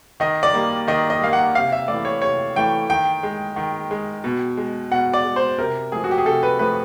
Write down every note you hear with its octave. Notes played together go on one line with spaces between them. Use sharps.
D#3 D#5
D5
G3 A#3
D#3 D#5
D#5
G3 A#3 F5
F#5
C3 F5
E5
E3 A3 D5
C#5
C3 C#5
E3 A3 G5
D#3 G5
G#3
D#3
G#3
B2
G#3
B2 F#5
D5
G#3
C5
C3 A#4
F3 A3 G#4
F#4
G4
G#4
C3 A4
B4
F3 A3 B4